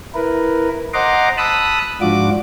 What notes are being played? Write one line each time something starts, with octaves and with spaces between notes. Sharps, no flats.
E4 A#4 B4
C5 D#5 F#5 A#5 C6 D6
A5 B5 D#6 E6 F#6
G#2 F3 D4 F4 F#4 D6